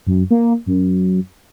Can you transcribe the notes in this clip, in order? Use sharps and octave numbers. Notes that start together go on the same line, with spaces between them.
F#2
A#3
F#2